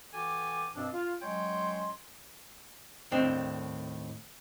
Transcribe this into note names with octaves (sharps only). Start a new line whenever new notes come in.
E3 F#4 A4 G5 G#5 D6
G2 B2 F3 C4 D4
F4
F#3 G#3 C#4 C#5 G5 C6
D#2 A2 C4 D4